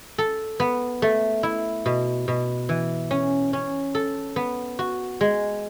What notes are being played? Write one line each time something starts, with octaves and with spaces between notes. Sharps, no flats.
A4
B3
A3
E4
B2
B2
E3
C#4
C#4
A4
B3
F#4
G#3